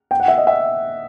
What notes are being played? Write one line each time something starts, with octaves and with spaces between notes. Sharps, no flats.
G5
F#5
E5
D#5
E5